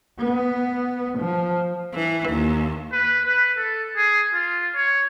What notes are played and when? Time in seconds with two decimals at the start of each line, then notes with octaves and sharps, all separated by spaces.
0.18 B3
1.18 F3
1.94 E3
2.29 D#2
2.92 B4
3.25 B4
3.57 A4
3.97 G#4
4.33 F4
4.75 C#5